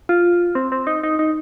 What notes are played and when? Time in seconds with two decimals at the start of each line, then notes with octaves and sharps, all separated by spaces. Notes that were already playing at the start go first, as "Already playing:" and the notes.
0.09 F4
0.55 C4
0.72 C4
0.87 D#4
1.03 D#4
1.19 D#4